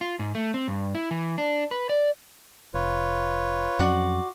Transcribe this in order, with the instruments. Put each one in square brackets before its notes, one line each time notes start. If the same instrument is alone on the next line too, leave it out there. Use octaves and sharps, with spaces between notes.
[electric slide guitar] F4
G#2
A3
C4
G2
E4
E3
D4
B4
D5
[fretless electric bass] F1 [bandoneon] F4 B4 C#5
[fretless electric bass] F2 F#3 C#4 [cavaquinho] F4 F#4 D5